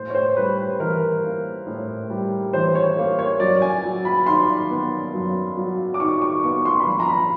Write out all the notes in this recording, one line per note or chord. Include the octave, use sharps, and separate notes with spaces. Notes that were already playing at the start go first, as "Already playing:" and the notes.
Already playing: A2 C5
C#5
C5
G3 B4
B4
E3 A#4
A#3
A2
G3
E3 C5
C#5
A#3
C#5
F#2 D5
G#5
F#3
B5
D#3 C6
B3
F#2
F#3
D6
D#3 C#6
C#6
B3 C#6
C6
B5
A#1 C6
A#5
B5